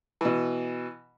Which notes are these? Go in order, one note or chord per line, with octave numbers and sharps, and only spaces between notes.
B2 E3